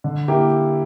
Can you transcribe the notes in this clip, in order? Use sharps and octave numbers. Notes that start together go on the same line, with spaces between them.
D3
A#3 E4 G4